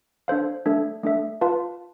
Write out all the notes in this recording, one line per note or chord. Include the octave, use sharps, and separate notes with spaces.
D4 A4 C5 F5
A3 D4 A4 E5
A3 D4 A4 E5
F4 B4 F5 A5